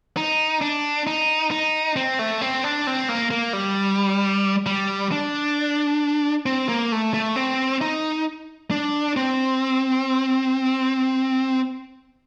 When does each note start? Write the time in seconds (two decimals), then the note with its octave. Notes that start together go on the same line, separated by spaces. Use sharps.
0.17 D#4
0.61 D4
1.07 D#4
1.51 D#4
1.96 C4
2.19 A3
2.41 C4
2.64 D4
2.87 C4
3.09 A#3
3.31 A#3
3.53 G3
4.66 G3
5.12 D4
6.46 C4
6.69 A#3
6.92 A3
7.14 A3
7.36 C4
7.81 D#4
8.71 D4
9.17 C4